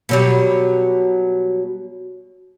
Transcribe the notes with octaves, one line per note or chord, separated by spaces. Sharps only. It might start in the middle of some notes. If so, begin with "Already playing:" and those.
B2 F#3 G3